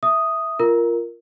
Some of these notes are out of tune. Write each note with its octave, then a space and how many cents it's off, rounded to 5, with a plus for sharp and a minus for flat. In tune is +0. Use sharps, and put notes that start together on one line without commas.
E5 +0 D#6 +0
F4 -15 A#4 +0